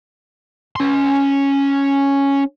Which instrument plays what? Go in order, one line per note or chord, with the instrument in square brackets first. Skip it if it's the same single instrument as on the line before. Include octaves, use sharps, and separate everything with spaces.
[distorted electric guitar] C#4 C6